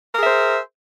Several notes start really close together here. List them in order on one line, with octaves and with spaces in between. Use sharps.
A#4 G#4 E5 C5